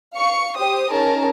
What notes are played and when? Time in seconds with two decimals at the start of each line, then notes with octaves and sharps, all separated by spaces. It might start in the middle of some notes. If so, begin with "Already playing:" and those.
0.17 F5 C#6 C#7
0.57 G4 C5 D#6
0.92 C#4 D#4 G#4 A#4 A5